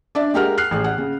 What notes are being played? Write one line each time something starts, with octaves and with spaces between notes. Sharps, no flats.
D4 D5 E5
G#3 G4 A#4 F#5 F6
F6 F#6 C7
A1 G#4
F#5
C#3